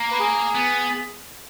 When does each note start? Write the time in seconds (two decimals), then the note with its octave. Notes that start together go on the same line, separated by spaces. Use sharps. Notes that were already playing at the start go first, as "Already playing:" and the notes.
Already playing: A#3
0.12 B4
0.20 G#4
0.55 B3